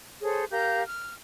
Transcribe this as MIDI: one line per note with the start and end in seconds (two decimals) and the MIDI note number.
0.22 0.44 68
0.22 0.44 69
0.22 0.44 72
0.22 0.44 73
0.50 0.82 67
0.50 0.82 70
0.50 0.82 77
0.50 0.82 91
0.87 1.14 89